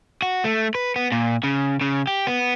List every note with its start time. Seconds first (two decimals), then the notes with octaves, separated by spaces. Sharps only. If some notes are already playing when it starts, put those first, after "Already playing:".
0.22 F#4
0.44 A3
0.75 B4
0.96 B3
1.12 A#2
1.44 C#3
1.81 C#3
2.07 G4
2.27 B3